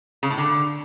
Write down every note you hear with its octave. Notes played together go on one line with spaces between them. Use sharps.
C#3
A2
D3